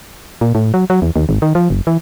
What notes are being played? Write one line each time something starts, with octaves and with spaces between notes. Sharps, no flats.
A#2
A2
F#3
F#3
E2
D#2
G#1
D#3
F3
F#1
E3